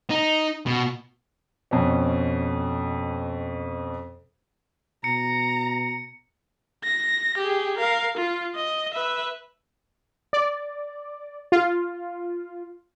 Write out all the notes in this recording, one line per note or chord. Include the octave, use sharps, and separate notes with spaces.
D#4
B2
F2 B2 C#4
B2 A#5 C#7
A#6
G4 G#4
A#4 F5
F4
D#5
B4 E5
D5
F4